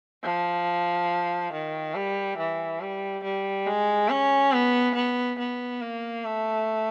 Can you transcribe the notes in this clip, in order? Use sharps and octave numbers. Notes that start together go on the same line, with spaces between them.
F3
D#3
G3
E3
G3
G3
G#3
C#4
B3
B3
B3
A#3
A3